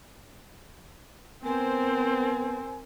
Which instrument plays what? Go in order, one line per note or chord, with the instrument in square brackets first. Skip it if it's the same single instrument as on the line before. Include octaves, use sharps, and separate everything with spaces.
[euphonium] B3 [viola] C4 [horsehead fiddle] A#4 C5 [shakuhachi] G#5